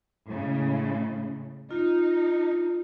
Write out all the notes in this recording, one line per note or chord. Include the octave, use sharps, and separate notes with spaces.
A2 C#3 G#3
D#4 F4